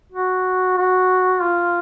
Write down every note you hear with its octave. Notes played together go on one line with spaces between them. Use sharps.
F#4
F#4
F4